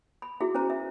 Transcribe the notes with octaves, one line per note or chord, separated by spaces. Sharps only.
B5
E4 F#4 G#4 E5
C#4 C5 A#5
E5